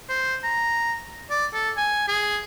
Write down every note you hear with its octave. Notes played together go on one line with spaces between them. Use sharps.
C5
A#5
D5
A4
G#5
G#4